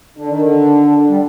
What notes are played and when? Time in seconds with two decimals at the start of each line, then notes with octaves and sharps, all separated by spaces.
0.17 D3 D4
0.29 D#3
0.41 D3
1.08 G3